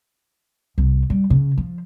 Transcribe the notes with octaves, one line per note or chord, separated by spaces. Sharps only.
C2
G3
C#3
F3